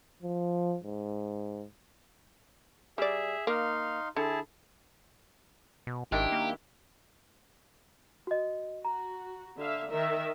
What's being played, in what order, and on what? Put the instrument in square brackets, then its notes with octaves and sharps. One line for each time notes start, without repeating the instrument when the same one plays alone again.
[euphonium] F3
G#2
[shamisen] G3 D5 [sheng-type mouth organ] G#4 E5
[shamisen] A#3 [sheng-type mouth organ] D#4 F5 C6
[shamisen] D3 [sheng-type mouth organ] E4 G#4 A5
[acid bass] B2
[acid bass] G#1 [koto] D#3 D4 E4 [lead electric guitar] G4
[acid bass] A#3
[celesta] F#4 D#5
[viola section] F#4 [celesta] A#5
[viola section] D3 E5 F5
D#3 A#4 E5